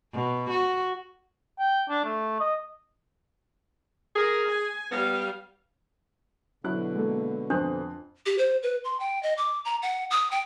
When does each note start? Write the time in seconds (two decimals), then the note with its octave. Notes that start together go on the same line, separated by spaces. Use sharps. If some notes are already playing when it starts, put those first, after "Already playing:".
0.13 B2
0.50 F#4
1.59 G5
1.89 D4
2.05 A3
2.40 D#5
4.16 G#4 A#4
4.49 G#5
4.91 G3 B3 F5
6.64 B2 D3 F#3 E4 F#6
6.95 G#3 A#3 A4
7.50 F2 C4 D4 D#6 F#6
8.26 G4
8.38 C5
8.63 B4
8.85 C6
9.00 G5
9.23 D#5
9.38 D6
9.65 A#5
9.82 F#5
10.11 D#6
10.32 G5